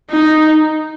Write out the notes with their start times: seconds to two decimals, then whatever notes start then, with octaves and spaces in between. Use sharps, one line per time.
0.11 D#4